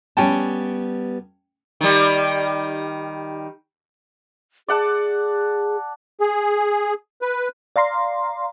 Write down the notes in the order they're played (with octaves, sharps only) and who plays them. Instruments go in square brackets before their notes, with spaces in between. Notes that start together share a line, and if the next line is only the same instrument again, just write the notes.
[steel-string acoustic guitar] G3 B3 [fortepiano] C#4 G5 A5
[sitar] D#3 G3
[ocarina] G#4 [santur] D5 F#5 A5
[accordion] G#4
B4
[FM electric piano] D5 F5 A#5 C6